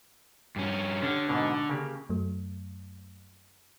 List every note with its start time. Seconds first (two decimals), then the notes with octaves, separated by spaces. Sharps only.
0.56 G2 C#4
1.03 D3 C#4 G4
1.28 G#2 B2 A#3
1.69 C#3 A#3 G4
2.10 F#2 F#3 A3